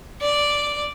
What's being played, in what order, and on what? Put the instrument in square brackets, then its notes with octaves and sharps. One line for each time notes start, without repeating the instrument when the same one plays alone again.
[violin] D5